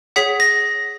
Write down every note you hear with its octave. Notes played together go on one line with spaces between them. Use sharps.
G#4 C#5 F#5 B6
A#6